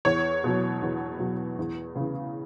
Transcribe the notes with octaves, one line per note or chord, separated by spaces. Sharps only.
E2 C#5
B2 F#3
E2
B2 F#3
E2
C#3 E3